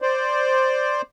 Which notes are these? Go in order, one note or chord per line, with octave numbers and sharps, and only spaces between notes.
C5 D5